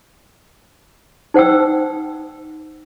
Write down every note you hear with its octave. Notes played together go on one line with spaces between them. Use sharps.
D#4 C5 F#5 G5 E6